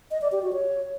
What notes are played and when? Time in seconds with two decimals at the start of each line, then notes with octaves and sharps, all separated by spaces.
0.11 D#5
0.22 D5
0.32 G4
0.42 F#4
0.53 C#5